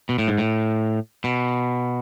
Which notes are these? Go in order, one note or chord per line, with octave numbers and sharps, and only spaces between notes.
B2
A2
G#2
A2
B2